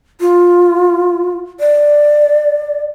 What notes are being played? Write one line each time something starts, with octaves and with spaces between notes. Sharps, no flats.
F4
D5